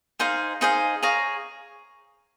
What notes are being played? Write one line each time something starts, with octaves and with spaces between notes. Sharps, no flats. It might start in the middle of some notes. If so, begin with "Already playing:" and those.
D#4 G#4 C5 F5
D#4 G#4 C5 F5
G#4 C#5 F5 A#5